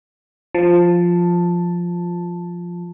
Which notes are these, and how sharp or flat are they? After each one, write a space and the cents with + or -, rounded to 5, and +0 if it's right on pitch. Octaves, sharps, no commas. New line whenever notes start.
F3 +0 A5 +0